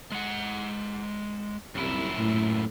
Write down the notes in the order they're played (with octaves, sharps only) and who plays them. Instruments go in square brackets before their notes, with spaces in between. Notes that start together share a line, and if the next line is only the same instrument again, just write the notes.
[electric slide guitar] G#3 F#5
[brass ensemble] C2 [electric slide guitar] F#2 A#2 E4
[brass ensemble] A2